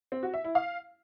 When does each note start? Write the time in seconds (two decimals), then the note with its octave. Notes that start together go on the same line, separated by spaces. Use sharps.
0.12 C4
0.23 F#4
0.34 E5
0.44 E4
0.55 F5